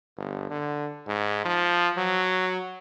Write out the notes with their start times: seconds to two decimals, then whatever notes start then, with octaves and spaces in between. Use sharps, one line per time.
0.17 G1
0.50 D3
1.07 G#2
1.45 F3
1.97 F#3